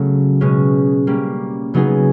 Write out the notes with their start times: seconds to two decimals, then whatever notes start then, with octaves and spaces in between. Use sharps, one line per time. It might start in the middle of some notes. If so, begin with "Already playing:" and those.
Already playing: C#3 F#3 A3
0.41 B2 G#3 C#4
1.07 G3 A#3 C#4
1.74 C#3 F#3 B3 D#4 G#4